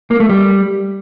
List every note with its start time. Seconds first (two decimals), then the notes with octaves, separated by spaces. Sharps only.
0.11 A#3
0.20 A3
0.29 G3